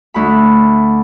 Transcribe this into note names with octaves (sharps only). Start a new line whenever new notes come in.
D2 B5